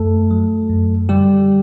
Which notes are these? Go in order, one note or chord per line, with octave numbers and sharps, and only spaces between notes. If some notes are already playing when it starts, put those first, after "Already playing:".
Already playing: F#2 A3 A4
F#3
F#2
D3 G3 G4